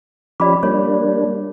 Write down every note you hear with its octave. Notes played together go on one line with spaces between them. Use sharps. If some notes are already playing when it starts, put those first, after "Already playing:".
F3 C#4 G4 D5 B5 D6
G3 A#3 D4 C#5